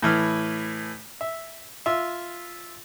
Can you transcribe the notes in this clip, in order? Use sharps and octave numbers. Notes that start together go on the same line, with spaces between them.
A2 E3 F6
E5
F4 E5